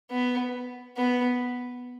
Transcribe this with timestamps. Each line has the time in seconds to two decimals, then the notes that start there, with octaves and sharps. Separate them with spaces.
0.11 B3
0.97 B3